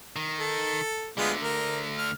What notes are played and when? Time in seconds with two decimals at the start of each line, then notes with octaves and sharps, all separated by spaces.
0.16 D#3
0.40 A4
1.17 D2 D3 G#3 B3 F4
1.41 A#4
1.97 F6